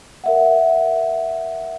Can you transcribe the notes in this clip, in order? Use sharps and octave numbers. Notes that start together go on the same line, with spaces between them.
A#4 E5 F#5